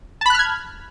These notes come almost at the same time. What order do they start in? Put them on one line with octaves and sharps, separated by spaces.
A5 B5 F#6 F6 G#6